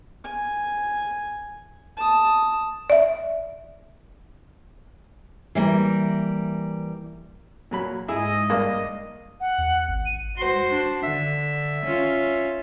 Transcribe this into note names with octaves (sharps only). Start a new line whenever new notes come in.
G#5
A5 D#6
D5 E5
E3 G3 A#3
A#2 F#3 B5
G#2 E4 G#4 D#5 E5
G2 A#3 D4
F#5
E2
G#1
D#7
F#4 C5
D4
D3 E5
C#4 F4